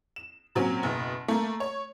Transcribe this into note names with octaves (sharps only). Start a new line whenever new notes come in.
E7
A#2 F#3 C4 C#4
F#1 B2
A3 A#3
C#5